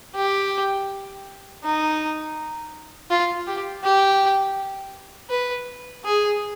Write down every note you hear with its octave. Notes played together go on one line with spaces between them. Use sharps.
G4
D#4
F4
G4
G4
B4
G#4